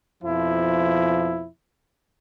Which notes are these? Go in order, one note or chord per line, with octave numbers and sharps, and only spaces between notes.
F2 B2 F3 E4